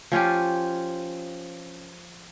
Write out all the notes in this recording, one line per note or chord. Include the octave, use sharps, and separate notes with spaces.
F3 C#4 F4 G4